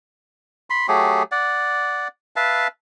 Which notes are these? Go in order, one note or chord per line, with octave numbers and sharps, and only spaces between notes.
B5 C6
F#3 A3 G4 G#4
D5 F#5
B4 E5 F5 A5